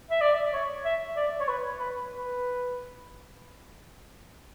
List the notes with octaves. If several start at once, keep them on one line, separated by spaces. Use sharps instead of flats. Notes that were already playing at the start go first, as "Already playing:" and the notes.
E5
D5
C#5
E5
D5
C#5
B4
B4
B4